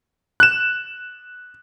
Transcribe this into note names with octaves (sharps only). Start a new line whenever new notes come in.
F#6 E7